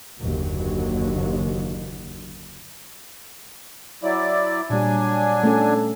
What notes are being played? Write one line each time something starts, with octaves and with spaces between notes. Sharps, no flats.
F#1 D#2 D3 F#3
F#3 E4 D5
A#2 F#3 G3 D4 G#5
A3 C#4 A4